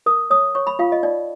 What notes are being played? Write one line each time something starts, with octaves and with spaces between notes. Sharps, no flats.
A#4 D#6
C#5 D#6
C#5 C#6
B5
F4 F5
D#5
D#4 D5